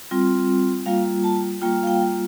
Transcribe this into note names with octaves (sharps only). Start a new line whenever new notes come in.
G3 C4 F4
G3 A#3 F4 F5
A5
G3 A#3 F4 G5
F5
G5